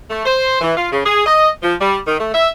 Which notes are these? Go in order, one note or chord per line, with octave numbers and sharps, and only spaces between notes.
A3
C5
E3
F4
C#3
G#4
D#5
F3
G3
D#3
A3
E5